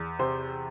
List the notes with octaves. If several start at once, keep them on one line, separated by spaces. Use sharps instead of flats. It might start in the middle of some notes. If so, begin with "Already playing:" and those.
Already playing: E2
C3 C5